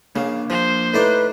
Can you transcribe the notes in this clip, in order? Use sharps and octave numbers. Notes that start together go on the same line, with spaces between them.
C#3 A#3 D4 F5
F3 C5
A2 D#4 B4 D5